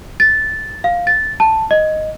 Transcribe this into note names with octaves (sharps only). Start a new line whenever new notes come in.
A6
F5
A6
A5
D#5